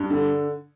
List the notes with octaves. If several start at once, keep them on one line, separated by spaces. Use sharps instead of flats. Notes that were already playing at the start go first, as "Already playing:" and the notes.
Already playing: G2
D3